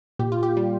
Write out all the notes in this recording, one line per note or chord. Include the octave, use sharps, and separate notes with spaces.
A#2 G4
F4
G4
G3